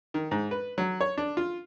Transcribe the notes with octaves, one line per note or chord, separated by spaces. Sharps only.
D#3
G#2
B4
F#3
C#5
D4
F4